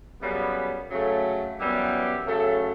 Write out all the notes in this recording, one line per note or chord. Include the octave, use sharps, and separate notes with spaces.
F#2 C#3 G3 B3
C#3 F#3 A3
F#2 E3 G3 B3 G4
C#3 F#3 A3 A4